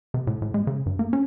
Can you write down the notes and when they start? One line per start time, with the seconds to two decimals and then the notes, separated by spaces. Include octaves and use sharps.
0.14 C3
0.27 A2
0.42 A2
0.54 G#3
0.67 C#3
0.86 G2
0.99 A#3
1.13 C#4